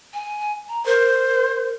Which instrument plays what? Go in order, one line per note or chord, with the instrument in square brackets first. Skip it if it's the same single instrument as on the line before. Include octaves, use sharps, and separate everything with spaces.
[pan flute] G#5
A#5
[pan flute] A#4 [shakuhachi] C5